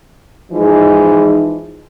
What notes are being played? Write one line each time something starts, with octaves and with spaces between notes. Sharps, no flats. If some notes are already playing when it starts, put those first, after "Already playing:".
E3 F3 G#3 D#4